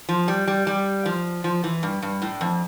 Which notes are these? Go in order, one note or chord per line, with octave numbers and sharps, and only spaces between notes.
F3
G3
G3
G3
F3
F3
E3
G2
G2
A2
F2